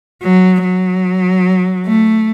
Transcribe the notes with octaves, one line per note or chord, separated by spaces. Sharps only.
F#3
F#3
A3